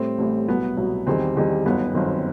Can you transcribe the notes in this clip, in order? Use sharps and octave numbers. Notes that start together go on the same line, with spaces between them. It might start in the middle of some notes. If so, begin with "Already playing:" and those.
Already playing: A2 G3 C4
A1 A2 G3
C2 B2 F#3 B3
C2 B2 F#3
E2 D#3 G3 C4
E2 D#3 G3
G1 F#2 D#3 B3
G1 F#2 D#3 C4